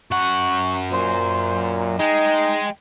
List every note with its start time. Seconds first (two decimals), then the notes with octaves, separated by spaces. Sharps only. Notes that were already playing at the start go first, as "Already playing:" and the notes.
0.11 F#2 F#5 C#6
0.91 A#2 C5
1.99 G#3 D#4 G5